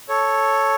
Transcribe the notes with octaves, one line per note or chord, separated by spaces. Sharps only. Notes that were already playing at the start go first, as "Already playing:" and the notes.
A4 C#5